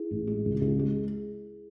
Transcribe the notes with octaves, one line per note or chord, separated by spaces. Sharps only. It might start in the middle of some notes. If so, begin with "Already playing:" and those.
Already playing: E4 G#4
A1
G#3
C#2
C#2
G#3